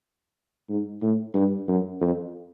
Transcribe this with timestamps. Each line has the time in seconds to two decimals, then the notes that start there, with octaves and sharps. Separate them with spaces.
0.69 G#2
1.02 A2
1.34 G2
1.68 F#2
2.01 F2